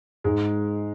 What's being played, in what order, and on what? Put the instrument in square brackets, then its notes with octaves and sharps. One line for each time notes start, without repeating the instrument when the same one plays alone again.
[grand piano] G#2 [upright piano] G#3